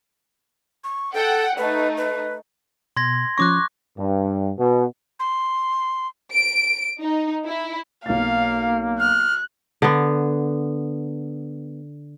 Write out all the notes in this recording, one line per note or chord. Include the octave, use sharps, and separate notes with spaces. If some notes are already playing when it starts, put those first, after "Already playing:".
C#6
A4 F#5 G5
A3 D#4 B4
B4
B2 C6 G#6 A#6
F3 C#4 C#6 D6 F#6 A#6
G2
B2
C6
D7
D#4
E4
B1 A#3 F5 A6
F6 F#6
D3 B3